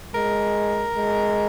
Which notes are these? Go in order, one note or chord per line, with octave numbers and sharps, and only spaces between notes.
G#3 A#4
G#3